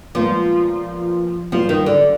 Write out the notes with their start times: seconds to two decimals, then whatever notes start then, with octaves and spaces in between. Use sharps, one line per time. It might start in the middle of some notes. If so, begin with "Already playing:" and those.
0.15 A#2 F3 G#3 B3 F4 A#4
1.52 A#2 F3 F#3 B3 F4 G#4
1.69 D#3
1.86 D3